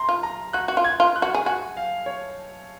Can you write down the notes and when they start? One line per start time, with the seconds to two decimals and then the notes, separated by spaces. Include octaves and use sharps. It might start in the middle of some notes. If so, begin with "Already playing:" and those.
Already playing: A#5 C6
0.09 F4
0.23 A#5
0.53 F#4 F#6
0.68 F#4
0.77 F4
0.84 G#6
1.00 F4
1.16 F#6
1.22 F#4
1.34 G#4
1.46 F#4 G#5
1.77 F5
2.06 C#5